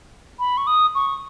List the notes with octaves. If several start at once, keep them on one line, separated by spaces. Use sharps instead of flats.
B5
C#6
D#6
C#6